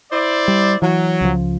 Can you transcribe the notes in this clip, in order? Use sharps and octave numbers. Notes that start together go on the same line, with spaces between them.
E4 C5 D5
G3
E3 F#3
C#2 F3